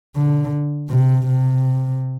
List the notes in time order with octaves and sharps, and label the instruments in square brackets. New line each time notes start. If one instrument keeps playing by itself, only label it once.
[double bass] D3
C3
C3